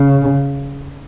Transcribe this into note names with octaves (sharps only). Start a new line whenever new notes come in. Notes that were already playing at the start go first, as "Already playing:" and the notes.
Already playing: C#3